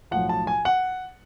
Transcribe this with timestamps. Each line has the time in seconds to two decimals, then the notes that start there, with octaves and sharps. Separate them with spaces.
0.11 B1 A2 F3 F#5
0.29 A5
0.47 G#5
0.65 F#5